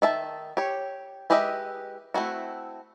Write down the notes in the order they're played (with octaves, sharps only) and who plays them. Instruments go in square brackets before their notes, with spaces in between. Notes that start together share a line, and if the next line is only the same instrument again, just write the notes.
[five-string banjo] D#3 E5 A5
G4 C#5
G#3 G4 B4 D#5 E5
A3 C4 E4 F#4